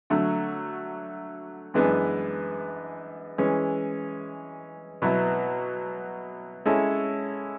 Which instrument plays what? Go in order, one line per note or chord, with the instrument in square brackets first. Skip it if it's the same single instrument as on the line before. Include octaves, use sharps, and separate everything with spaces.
[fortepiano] D3 F#3 A3
F#2 E3 G#3 B3 D4
E3 G#3 C#4
B2 F#3 B3 E4
G#3 C#4 E4 A4 C#5